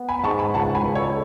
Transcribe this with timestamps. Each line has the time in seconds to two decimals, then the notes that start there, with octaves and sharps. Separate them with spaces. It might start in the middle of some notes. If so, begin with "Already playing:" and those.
Already playing: B3
0.09 G#5 B5
0.19 B5
0.24 G#2 A5 C#6
0.39 G#5 B5
0.54 C#2 F#5 A5
0.75 G#5 B5
0.85 C#2
0.95 A4 C#5